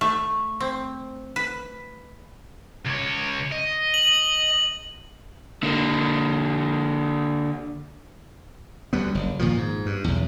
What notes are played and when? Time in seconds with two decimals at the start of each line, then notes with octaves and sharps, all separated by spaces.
0.01 A3
0.60 C4
1.36 B4
2.86 C#2 C#5
3.52 D#5
3.94 F#7
5.63 D3 A#3
8.93 D2 G3 B3
9.15 F#1
9.39 A#2 D#3 F3
9.58 G#2
9.86 G2
10.04 B1 E2